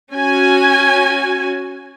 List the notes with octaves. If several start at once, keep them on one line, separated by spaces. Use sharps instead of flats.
C#4 F#4 G#5